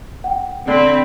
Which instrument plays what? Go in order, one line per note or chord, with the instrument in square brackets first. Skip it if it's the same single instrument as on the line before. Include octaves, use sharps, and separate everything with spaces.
[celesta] F#5 G5
[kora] D3 [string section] C4 [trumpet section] B5